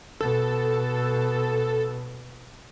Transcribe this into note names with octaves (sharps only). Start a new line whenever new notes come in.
B2 A4